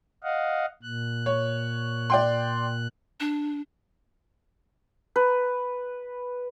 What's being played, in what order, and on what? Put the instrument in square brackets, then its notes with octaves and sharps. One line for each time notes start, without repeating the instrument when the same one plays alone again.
[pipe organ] D#5 F5 F#5
A#2 F#6
[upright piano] C#5
D5 G5 C6
[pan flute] D4
[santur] B4